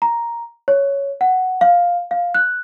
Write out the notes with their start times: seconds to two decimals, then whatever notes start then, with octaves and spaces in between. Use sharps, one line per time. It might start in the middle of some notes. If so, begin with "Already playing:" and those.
0.02 A#5
0.68 C#5
1.21 F#5
1.61 F5
2.11 F5
2.34 F#6